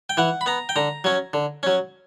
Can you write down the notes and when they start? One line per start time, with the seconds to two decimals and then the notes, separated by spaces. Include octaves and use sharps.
0.09 G5
0.17 E3 F#5
0.41 B5
0.46 B3 A#5
0.69 G5
0.76 D3 A#5
1.04 F#3 C#4
1.33 D3
1.63 F#3 C#4